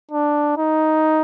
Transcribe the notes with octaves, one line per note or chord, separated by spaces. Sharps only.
D4
D#4